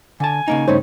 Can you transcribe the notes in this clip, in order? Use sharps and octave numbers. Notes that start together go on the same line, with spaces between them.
D3 G#5 A5
C#3 A#3 D#4
G2 C#3 A3 D#4 C5 C#5